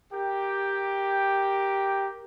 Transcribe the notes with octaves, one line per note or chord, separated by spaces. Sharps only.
G4 A#4 G5